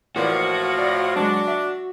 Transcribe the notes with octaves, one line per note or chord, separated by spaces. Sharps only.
A2 E3 F3 A#3 F#4 D5
D5
F#3 G#3 D4
E5